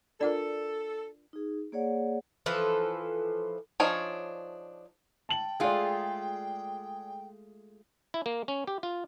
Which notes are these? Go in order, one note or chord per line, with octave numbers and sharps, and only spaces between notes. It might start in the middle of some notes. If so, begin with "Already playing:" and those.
D4 F4 A4 A#4 D5 F#5
D#4 G#4
A#3 G#4 C#5 D5 F#5
E3 F3 A4 B4
F3 D4 D#4 G#4 C#5
G5 A5 F#7
G#3 A3 F4 G#4 D5
E4
A#3
C#4
G4
F4